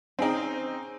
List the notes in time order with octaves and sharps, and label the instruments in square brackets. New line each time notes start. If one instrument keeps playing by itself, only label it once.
[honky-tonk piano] C4 D#4 [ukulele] C#4 G#4 G5